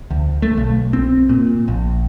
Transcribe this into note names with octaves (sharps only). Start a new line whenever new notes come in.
D2
A3
B1
C4
A#2
A#1